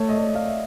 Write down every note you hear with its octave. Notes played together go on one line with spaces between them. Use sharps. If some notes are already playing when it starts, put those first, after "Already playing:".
Already playing: A3 C#5
D#5
D5
F5
E5